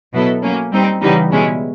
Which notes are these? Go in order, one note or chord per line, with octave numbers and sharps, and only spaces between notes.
B2 F#3 B3 E4 A4
F#3 A#3 C#4
G3 C4 D#4
C#3 E3 G3 B3 D#4
B2 G#3 C#4 E4